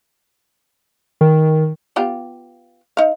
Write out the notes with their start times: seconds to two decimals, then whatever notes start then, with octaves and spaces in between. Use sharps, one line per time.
1.21 D#3
1.96 B3 F4 G4
2.97 D#4 F5